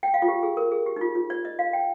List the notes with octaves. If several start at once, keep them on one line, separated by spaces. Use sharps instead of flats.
G5
F5
F4
G4
G#4
A#4
G#4
G4
D#4
F4
F4
D5
D#5
F5
G5